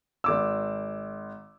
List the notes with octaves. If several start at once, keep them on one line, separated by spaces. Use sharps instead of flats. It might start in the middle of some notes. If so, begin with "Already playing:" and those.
G#1 D6 E6